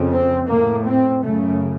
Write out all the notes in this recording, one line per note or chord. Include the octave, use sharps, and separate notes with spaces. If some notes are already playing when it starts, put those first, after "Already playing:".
Already playing: F2 C#3
C4
A2 A#3
C4
F#2 C#3 A3